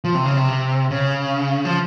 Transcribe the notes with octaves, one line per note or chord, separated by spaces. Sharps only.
F3
C3
C#3
C3
C#3
F3